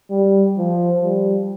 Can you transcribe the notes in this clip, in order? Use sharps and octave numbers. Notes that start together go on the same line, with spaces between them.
G3
F3
G3